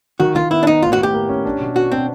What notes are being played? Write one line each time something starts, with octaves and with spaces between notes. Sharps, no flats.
D#3 F#4
D#3 F4
B3 E4
D4
B3 D#4
A2 F4
F#4
A2 G4
A#3
C#4
D4
B2
B3 F#4
C4 D4